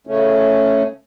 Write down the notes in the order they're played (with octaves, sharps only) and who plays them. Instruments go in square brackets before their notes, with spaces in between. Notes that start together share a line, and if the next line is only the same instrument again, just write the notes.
[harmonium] C#3 A3 C#4